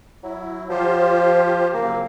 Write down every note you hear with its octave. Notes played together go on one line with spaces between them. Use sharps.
F#3 E4
F3 F4 G4 C5
C#3 F#3 A#3 C4